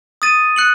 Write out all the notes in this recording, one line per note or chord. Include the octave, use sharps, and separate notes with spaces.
D#6 A6 D#7
F#6 C#7 F#7